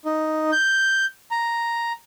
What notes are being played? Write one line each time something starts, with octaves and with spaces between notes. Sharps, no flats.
D#4
G6
A#5